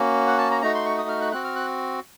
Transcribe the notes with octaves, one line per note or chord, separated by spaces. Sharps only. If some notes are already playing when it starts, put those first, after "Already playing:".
Already playing: A#3 C#4 F#4
F#5
A5
A#5
A3 D#4 F#4 A#5
C6
C#6
D#6
F6
F#6
C4 F#4 F#6
F6
F#6